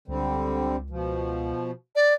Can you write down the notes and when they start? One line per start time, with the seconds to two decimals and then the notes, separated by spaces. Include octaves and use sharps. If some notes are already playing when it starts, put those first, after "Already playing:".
0.08 C#2 D3 G3 C4
0.90 B2 F3
1.96 D5